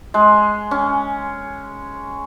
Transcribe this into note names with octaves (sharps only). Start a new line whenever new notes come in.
G#3
C#4